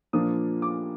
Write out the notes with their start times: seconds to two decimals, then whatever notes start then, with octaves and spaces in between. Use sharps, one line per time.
0.13 A#2 F3 A#3 D4 D#6
0.62 D6